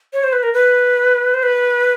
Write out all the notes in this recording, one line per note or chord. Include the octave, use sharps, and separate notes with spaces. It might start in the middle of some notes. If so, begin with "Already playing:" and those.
C#5
C5
B4
A#4
B4
C5
B4